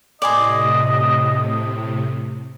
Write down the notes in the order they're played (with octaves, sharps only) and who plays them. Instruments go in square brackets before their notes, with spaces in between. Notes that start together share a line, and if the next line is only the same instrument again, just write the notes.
[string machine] A2 C3 [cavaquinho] D5 G#5 C6 [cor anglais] D#5